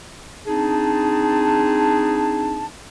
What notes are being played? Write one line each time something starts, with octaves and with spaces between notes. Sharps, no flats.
C4 D4 D#4 G#4 A5